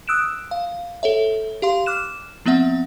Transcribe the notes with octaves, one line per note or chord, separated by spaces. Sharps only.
D#6 E6 F#6 D7 E7
F5
A4 C#5 E5
G4 F5 C6
D6 F6 F#6 E7
F3 B3 C4 E5 F#5